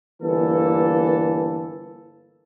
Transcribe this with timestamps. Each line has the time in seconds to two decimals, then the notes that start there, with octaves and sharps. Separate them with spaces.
0.21 G1 E3 A#3 A4